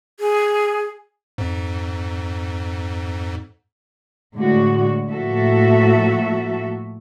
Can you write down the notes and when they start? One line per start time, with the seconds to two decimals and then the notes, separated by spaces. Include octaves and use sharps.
0.20 G#4
1.38 F2 G#2
4.36 A2 D3 G#3 F#4
5.08 A2 F3 A#3 F#4 A4 E5